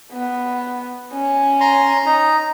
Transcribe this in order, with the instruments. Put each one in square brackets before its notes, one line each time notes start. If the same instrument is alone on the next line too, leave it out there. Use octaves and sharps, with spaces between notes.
[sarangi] B3
C#4
[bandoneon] A#5 C6
D#4 A#5